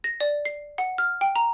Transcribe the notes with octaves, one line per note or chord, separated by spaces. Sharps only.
A#6
D5
C7
F#5
F6
G5
A#5